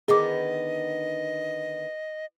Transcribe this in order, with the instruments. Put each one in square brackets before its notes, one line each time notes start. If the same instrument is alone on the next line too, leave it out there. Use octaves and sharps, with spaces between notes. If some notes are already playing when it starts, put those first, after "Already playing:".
[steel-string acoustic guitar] D3 D#3 B3 [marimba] G#4 D6 [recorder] D#5